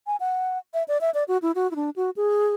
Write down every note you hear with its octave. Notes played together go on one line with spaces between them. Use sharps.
G#5
F#5
E5
D5
E5
D5
F#4
E4
F#4
E4
D4
F#4
G#4